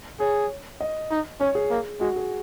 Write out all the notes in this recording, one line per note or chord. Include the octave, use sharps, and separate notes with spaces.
G#4 C#5
D#5
D#4
C#4 C#5
G#4
A#3
G#3 F#4
G#4